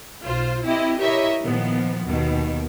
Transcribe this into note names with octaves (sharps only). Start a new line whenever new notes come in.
B1 F4 C5
C4 E4 G4 D#5
E4 G4 A#4 C#5 D#5 E5
A#2 D#3 F3 B3
D#2 B2 D#3